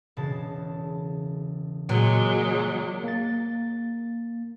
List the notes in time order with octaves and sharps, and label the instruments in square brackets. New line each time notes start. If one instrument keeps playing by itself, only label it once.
[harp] E1 C#3 A5
[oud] A#2 [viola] F#3 G#3
[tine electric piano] A#3 A6